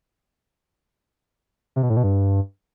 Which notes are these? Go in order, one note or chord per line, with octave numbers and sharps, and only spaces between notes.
C3
B2
A2
B2
G2